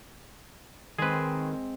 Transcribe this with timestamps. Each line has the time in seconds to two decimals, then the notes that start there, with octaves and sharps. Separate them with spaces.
0.99 D#3 G#3 C4 G#4 B4